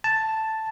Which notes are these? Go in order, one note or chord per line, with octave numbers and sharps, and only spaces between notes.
A5